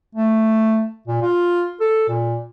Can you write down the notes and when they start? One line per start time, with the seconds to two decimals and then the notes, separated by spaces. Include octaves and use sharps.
0.15 A3
1.08 A#2
1.22 F4
1.81 A4
2.09 A#2